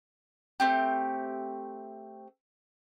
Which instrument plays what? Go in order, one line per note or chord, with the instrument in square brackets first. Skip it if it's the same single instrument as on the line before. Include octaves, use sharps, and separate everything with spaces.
[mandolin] A3 C4 G4